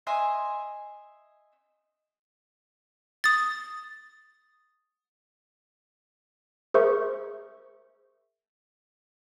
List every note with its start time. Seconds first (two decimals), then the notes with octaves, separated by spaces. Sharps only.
0.07 D#5 E5 G#5 C6
3.24 D#6 A6
6.74 G#4 A#4 C5 E5 C#6